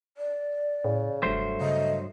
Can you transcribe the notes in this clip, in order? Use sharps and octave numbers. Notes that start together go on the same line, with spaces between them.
D5
A2 C#3
F1 G2 F#3 A3 C5
C#3 D#5